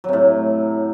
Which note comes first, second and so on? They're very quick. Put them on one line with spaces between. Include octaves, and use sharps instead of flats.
F#3 C3 A2